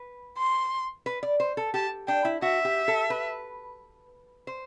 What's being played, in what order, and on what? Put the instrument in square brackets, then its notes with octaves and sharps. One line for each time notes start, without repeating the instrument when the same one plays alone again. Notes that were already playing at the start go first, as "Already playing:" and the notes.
Already playing: [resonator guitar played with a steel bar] B4
[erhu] C6
[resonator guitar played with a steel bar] B4
D5
C5
A4
[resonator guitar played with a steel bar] G4 [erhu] A5
[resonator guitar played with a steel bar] D4 [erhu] G5
[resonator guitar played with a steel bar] E4
[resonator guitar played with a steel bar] F#4 [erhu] E5
[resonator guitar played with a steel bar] G4
A4
B4
C5